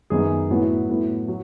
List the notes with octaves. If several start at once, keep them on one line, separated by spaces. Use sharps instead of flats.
F#2 D#3 G#3 B3 G#4
A2 F#3 B3 E4
A2 F#3 B3 E4
F#3